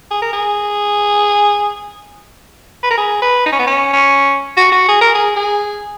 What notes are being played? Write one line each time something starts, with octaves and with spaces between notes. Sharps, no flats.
G#4
A#4
G#4
B4
A#4
G#4
B4
D#4
C#4
B3
C#4
C#4
F#4
F#4
G#4
A#4
G#4
G#4